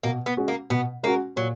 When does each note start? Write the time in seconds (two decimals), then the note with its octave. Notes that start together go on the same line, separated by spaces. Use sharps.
0.03 B2 A#3
0.26 B3
0.37 G#3 C#4 F#4
0.48 A#3
0.70 B2 B3
1.03 G#3 A#3 C#4 F#4
1.36 A#2 F#3